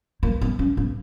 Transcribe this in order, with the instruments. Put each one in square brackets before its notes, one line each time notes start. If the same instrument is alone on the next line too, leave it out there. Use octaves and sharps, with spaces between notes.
[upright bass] A#3
B3
C#4
B3